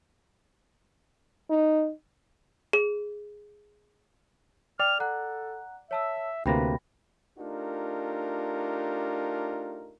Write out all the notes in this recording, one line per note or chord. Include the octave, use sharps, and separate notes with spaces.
D#4
G#4
D5 G5 F6
A4 F#5 A#5 F#6
C#5 E5 A5 E6
D2 C3 A#3 B4 G5 B5 A#6
A3 D4 D#4 F4 G4 A#4